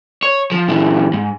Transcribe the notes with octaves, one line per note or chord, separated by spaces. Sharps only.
C#5
F3
A#2 E3
G#2